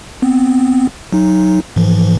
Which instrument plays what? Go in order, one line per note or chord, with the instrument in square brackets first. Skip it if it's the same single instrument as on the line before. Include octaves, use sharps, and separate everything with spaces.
[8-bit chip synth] B3 C4
F#3 D#4
G#2 E3 F3